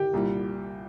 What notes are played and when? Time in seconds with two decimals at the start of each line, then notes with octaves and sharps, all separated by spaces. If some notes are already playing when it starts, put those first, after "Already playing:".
Already playing: G4
0.14 C2 A#2 G3